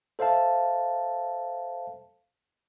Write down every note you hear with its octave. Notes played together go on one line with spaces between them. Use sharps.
A4 C5 E5 F5 A5